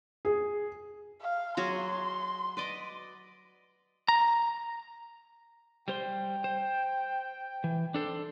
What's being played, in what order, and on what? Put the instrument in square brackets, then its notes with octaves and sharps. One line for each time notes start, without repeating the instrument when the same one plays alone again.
[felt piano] G#4
[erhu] F5
[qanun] F#3 F#4 G#4 [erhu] C6
[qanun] B4 D5 D#5
[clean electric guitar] A#5
[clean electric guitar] G3 C5 C6 [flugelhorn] G5
[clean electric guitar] C5
E3
D4 A4 C5